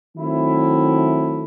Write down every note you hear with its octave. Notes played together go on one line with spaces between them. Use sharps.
D#3 F#3 A3 C4 E4